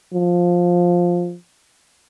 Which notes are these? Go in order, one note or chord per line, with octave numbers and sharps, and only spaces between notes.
F3